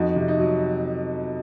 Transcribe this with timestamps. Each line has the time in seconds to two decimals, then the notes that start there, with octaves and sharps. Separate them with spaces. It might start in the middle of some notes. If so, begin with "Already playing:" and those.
Already playing: F2 D#4 F#4
0.16 C3
0.28 D#4
0.40 F#3